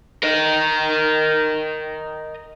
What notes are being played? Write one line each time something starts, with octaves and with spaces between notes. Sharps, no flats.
A#4 D#5